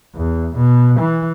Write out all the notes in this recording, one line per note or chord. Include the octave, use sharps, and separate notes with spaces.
E2
B2
E3